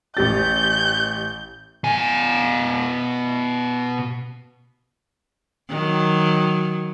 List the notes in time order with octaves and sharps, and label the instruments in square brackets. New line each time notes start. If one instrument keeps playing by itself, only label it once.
[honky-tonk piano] A1 G4 A6 [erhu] G6
[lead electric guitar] B2 G#5
[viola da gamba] D#3 F#3